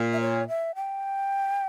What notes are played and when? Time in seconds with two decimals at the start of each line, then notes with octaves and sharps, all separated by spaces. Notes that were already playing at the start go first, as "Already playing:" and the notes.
Already playing: A#2
0.13 E5
0.21 C#5
0.48 E5
0.75 G5